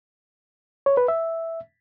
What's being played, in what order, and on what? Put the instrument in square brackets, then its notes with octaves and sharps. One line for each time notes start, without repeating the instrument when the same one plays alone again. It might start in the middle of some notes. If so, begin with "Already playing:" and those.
[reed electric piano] C#5
B4
E5